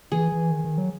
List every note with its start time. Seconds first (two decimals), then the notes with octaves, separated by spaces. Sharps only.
0.12 E3 G#4
0.32 E3
0.51 D#3
0.65 D#3
0.78 F#3